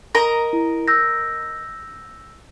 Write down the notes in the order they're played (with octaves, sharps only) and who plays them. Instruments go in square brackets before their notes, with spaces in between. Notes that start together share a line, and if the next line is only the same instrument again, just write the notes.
[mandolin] A#4 D#5 A#5
[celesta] E4
E6 G6 A#6